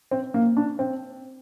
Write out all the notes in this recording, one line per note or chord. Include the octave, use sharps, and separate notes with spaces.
C4
A#3
D4
C4